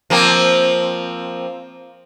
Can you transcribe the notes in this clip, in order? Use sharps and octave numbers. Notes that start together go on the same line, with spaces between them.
F3 A#3 C4